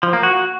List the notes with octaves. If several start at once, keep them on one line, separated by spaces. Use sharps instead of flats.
F3
A#3
F#4